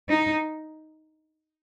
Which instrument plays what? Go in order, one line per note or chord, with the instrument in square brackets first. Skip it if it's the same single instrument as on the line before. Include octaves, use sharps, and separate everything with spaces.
[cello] D#4